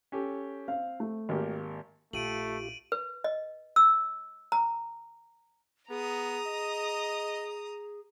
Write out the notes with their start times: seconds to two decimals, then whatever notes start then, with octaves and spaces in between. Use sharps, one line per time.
0.12 C#4 G4 A4
0.68 C4 F5
1.00 A3
1.29 G#1 A#3 G4
2.13 A#1 A3 F4 G4 D7 D#7 F#7
2.92 B4
3.24 D#5
3.76 E6
4.52 A#5
5.90 B3 G#4 A#5 D#6
6.47 D#5